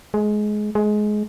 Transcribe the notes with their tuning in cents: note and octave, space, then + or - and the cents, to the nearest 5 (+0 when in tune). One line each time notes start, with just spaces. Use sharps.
G#3 +20
G#3 +20